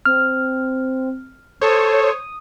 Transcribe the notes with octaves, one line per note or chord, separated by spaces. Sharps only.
C4 F6
A4 C5 C#5 D#6